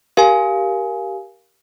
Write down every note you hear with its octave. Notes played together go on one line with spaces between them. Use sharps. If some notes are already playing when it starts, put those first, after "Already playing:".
G4 A#4 F5 G#5